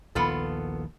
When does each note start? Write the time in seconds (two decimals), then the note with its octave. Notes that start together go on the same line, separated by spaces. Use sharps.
0.15 A#1 D#2 D#3 B3 F4 A4